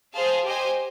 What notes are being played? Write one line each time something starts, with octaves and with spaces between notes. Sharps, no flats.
G#4 C5 F5 A5
G4 C5 D#5 G#5